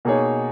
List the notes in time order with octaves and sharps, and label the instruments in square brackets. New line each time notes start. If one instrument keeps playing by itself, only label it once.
[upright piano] B2 A#3 D#4 G#4 C#5